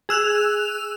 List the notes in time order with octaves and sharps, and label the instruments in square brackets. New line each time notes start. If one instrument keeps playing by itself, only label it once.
[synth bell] G#4 E6 F#6 F7